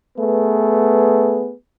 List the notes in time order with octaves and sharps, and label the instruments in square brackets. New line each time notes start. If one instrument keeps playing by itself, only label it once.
[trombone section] A3 B3 G#4 B4